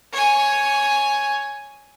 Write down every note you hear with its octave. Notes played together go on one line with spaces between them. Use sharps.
C#5 G#5